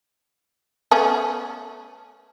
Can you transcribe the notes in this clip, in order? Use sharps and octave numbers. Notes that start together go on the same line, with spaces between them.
A3 B3 C#4